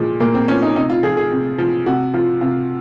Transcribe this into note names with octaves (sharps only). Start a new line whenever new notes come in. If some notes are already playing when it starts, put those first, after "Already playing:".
Already playing: A#2 F3 G#3
A#2 A#3
C4
F3 C#4
D#4
C3 D#4
F4
F3 G#4
G#4
C3
F3
C3 F#4
F3 F4
C3 F4